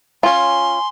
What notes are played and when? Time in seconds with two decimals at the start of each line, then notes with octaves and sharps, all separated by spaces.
0.23 C#4 F4 G#5 C6